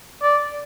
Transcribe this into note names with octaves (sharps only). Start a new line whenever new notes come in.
D5